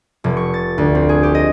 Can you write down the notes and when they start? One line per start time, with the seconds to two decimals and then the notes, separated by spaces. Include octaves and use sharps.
0.24 F1
0.37 C#6
0.54 A6
0.78 D2
0.95 C4
1.09 G#4
1.23 G4
1.35 D#5